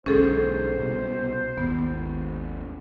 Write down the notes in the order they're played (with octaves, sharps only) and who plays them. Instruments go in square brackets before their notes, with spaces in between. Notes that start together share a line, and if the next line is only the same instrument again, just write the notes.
[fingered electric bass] B1 G#2 D3 [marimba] C#4 G#4 A4 [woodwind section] C5
[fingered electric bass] C2 B2
[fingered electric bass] G#1 D#2 [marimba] B3